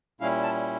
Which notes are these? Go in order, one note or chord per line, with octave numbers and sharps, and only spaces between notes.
A#2 G3 C#4 E4 F5
A5